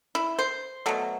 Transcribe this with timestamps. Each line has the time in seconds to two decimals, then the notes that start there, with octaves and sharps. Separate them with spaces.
0.15 E4
0.39 C5
0.86 B2 F#3 A3